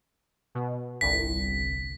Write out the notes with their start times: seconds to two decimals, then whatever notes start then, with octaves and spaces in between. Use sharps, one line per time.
0.55 B2
1.01 G1 C2 B6